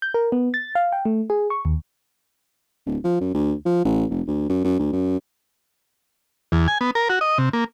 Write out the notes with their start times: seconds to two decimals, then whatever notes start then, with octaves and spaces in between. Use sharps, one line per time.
0.02 G6
0.14 A#4
0.32 B3
0.54 A6
0.75 F5
0.92 G5
1.05 A3
1.30 G#4
1.50 C#6
1.65 D#2
2.86 D1
3.04 F3
3.21 F#2
3.35 D2
3.66 F3
3.85 A1
4.10 F1
4.27 D2
4.49 F#2
4.64 F#2
4.79 D2
4.93 F#2
6.52 E2
6.68 G#5
6.81 B3
6.95 A#4
7.09 F#4
7.21 D#5
7.38 C3
7.53 A#3